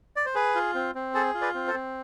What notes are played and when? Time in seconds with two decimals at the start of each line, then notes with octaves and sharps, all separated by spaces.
0.16 D5
0.26 C5
0.35 G#4 B4
0.55 F4
0.75 C4
0.95 C4
1.14 G#4 A4 C5
1.35 F4
1.41 B4 D5
1.54 C4
1.68 A4 C5
1.74 C4